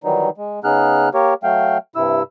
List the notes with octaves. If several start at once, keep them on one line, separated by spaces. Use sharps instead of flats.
D#3 E3 F#3 G3 D#4
G#3
C#3 B3 D#4 G#4 F6 F#6
A#3 G4 A#4 C#5
F#3 A3 F5 G5
G2 C3 E4 E6